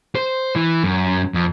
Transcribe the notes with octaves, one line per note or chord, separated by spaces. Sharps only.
C5
E3
F#2
F2